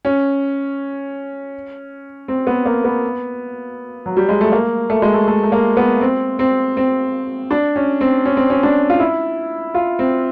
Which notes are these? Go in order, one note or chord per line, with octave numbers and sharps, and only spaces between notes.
C#4
C4
B3
A#3
B3
F#3
G3
G#3
A3
A#3
A3
G#3
A3
A3
A3
A#3
B3
C4
C4
C4
D4
C#4
C4
C#4
C4
C#4
D4
F4
E4
F4
C4